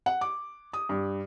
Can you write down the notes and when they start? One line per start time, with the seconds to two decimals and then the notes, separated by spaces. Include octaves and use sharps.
0.06 F#5
0.21 D6
0.73 D#6
0.89 G2